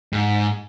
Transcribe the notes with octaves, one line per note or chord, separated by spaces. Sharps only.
G#2